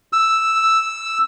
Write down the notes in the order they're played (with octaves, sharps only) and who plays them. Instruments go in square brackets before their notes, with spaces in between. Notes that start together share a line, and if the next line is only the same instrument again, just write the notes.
[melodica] E6